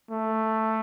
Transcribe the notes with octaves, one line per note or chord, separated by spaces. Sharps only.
A3